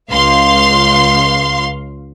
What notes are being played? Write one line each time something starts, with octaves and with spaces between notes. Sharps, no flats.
C#2 F5 C6